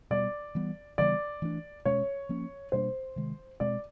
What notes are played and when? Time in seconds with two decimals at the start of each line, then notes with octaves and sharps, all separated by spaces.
0.10 B2 G3 B3 D5
0.55 E3 G3 B3
0.98 C#3 E3 G3 B3 D5
1.42 E3 A3 D4
1.85 B2 G#3 C#4 C#5
2.29 F3 A#3 C#4
2.72 B2 G3 A#3 D4 C5
3.16 C3 D#3 G#3
3.60 B2 G#3 C4 D5